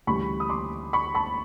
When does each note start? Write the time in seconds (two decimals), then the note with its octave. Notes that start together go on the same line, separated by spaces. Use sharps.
0.07 D2 C#3 E3 G3 B5 C#6
0.40 D#6
0.50 C6 D6
0.93 B5 C#6
1.15 A5 B5